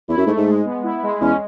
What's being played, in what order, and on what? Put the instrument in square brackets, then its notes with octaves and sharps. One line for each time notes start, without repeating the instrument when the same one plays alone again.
[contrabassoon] E2 [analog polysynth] E4
[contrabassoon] F#2
[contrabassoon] G#2 [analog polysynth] A3
[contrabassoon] G#2
[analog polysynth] G#3
B3
E4
G#3
[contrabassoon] E2 [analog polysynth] C#4